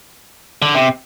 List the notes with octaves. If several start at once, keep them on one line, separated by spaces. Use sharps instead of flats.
D3
C3